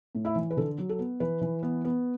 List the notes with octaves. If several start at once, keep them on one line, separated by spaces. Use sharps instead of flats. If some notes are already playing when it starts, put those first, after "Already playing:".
A2
E4 E5
E3
B4
D3 A4
F#3
A4
B3
E3 B4
E3
B3
B3